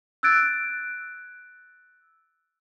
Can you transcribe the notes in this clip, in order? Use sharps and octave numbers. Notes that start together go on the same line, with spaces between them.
E6 F#6 G#6 A6 D7